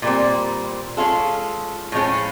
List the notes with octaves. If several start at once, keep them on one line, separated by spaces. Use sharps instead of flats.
A#2 G3 C4
G#3 C#4 F4 A4
A2 F3 G#3 C#4